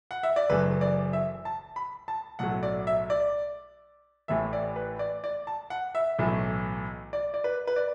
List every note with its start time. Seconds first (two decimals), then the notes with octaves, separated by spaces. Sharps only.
0.11 F#5
0.23 E5
0.36 D5
0.49 F#1 F#2 E3 A3 B4
0.81 D5
1.13 E5
1.45 A5
1.76 B5
2.08 A5
2.39 B1 A2 F#3 A3 F#5
2.63 D5
2.87 E5
3.10 D5
4.28 A1 A2 E3 A3 E5
4.53 D5
4.76 B4
4.99 D5
5.24 D5
5.47 A5
5.70 F#5
5.95 E5
6.18 B1 A2 E3 A3
7.13 D5
7.34 D5
7.44 B4
7.67 B4
7.76 D5